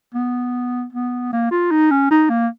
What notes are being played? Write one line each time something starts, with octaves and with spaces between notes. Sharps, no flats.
B3
B3
A#3
F4
D#4
C#4
D#4
A#3